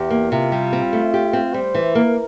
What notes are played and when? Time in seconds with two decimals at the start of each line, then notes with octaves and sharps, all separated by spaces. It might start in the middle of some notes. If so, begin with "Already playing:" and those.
Already playing: E2 G4
0.10 A#3
0.31 C3 F4
0.52 G3
0.73 C4
0.93 A3
1.14 G4
1.33 C4
1.54 G3 C5
1.75 E3
1.95 A#3 A#4